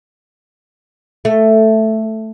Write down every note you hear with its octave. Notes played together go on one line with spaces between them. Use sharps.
A3